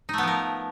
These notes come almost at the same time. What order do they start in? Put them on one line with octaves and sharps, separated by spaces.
D#4 A3 B3 F3 A#4